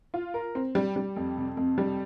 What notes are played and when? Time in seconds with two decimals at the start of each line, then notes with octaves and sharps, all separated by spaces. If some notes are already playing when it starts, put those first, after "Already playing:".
0.14 F4
0.34 A#4
0.55 C4
0.75 G3
0.96 G3
1.16 F2
1.37 C3
1.57 F2
1.78 G3